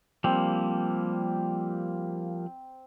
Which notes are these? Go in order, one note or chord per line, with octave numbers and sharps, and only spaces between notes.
F3 G3 A#3 C4